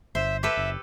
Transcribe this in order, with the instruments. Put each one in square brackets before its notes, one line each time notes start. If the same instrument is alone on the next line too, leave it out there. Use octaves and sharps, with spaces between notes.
[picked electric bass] G1 [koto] C5 [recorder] E5
[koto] G4 A4 B4 [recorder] E5
[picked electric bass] F#1